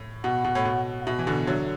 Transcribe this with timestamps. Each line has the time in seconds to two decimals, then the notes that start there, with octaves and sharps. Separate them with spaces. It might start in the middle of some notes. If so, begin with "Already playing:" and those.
Already playing: A2
0.24 B2 F#5
0.45 B2
0.55 A2
0.65 B2
1.00 F#5
1.06 B2 E5
1.19 E3
1.27 B2 D3
1.47 D3 F#3